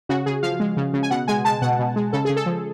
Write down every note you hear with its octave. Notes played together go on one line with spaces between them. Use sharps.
C#3 F#4
C#3 G#4
F3 F5
G#3
C#3
C#3
G#5
B2 F#5
G#3 G#5
G#3 A5
B2 F#5
B2
G#3
C#3 A4
C#3 G#4
A4
F3